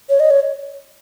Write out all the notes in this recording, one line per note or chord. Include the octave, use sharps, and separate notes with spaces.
C#5
D#5
C#5